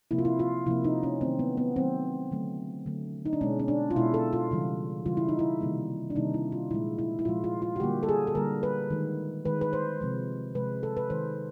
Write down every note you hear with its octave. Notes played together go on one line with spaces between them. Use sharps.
C3 F3 A#3 E4
F4
E4
F4
C3 F3 A#3 E4
D#4
C#4
D#3 F#3 A3 C4
B3
B3
D#3 F#3 A3 C4
D3 F#3 A3
D3 F#3 A3
D#4
D4
B2 G#3 C#4
C#4
D4
F4
B2 G#3 E4
A4
F4
C#3 E3 G3
C#3 E3 G3 F4
E4
D#4
E4
C3 D#3 G3 A#3
D4
C3 D#3 G3 A#3 D#4
E4
F4
A#2 F3 G#3 E4
E4
E4
A#2 F3 G#3 F4
F4
F4
F#4
D3 G3 A#3 G4
A4
G#4
A4
D3 G3 A#3 A#4
B4
D#3 G#3
D#3 G#3 B4
B4
C5
C3 F3 G#3
C3 F3 G#3 B4
A4
B4
D#3 G#3 C5